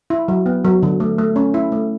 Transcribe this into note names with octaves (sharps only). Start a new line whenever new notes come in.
E4
F#3
B3
F#3
D3
A3
A3
C#4
E4
A3